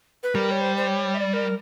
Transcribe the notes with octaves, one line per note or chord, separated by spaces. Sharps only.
B4
G3 A#4
C#5
C5
C5
C#5
E5
D5
A#4